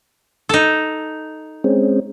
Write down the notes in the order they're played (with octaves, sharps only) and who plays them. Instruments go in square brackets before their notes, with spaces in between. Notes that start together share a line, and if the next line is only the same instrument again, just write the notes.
[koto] D#4 A4
[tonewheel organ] G#3 C4 C#4